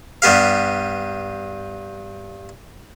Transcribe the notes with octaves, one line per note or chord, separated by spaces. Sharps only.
G2 B3 G4 F5